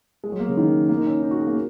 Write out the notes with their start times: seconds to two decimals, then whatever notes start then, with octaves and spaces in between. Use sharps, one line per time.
0.24 G#3
0.32 F#3
0.40 A#3
0.49 C#3
0.57 D#3
0.89 A#3
0.98 D#4
1.06 C#4
1.22 D#4
1.31 F#4
1.39 G#4
1.47 A#3